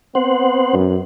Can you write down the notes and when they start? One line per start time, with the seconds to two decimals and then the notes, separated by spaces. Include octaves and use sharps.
0.15 B3 C4 C5 F#5
0.74 F#2